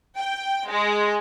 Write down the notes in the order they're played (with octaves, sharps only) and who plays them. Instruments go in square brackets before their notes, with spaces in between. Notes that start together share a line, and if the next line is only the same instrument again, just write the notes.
[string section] G5
G#3